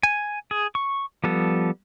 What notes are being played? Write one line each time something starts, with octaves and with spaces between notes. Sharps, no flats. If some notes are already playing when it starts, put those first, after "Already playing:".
G#5
G#4
C#6
F3 G3 B3 A4